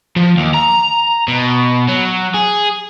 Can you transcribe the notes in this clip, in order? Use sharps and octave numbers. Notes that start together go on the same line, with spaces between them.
F3
D#2
A#5
B2
F#3
G#4